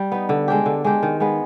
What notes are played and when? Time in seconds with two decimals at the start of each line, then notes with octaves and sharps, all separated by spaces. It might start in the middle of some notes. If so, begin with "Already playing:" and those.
Already playing: G3
0.12 B3 D#4
0.29 D3
0.48 G#3 D4 G4
0.66 D3
0.84 G#3 D4 G4
1.03 D#3
1.20 G#3 B3